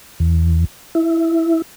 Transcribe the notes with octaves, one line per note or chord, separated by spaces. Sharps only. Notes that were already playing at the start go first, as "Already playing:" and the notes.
E2
E4